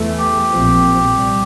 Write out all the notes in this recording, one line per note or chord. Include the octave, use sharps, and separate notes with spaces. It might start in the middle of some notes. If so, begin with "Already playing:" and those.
Already playing: E2 E3 A3
G4
A#1 A#2 F3 C4
C2 C3 G3